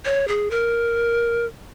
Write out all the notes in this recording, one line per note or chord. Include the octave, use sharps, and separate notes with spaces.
C#5
G#4
A#4